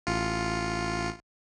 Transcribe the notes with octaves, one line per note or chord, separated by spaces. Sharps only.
A1 F4 C#7